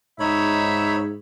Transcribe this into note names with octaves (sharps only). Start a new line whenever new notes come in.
G#2 D#4 C#5 E5 B5